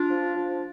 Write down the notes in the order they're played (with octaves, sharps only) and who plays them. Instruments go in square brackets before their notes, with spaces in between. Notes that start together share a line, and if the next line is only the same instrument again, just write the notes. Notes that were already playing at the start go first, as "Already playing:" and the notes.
Already playing: [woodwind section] D4 F4
F3
F3